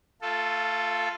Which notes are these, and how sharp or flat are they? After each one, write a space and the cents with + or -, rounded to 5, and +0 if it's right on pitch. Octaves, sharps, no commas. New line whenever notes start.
A3 +30 F4 +0 A4 +0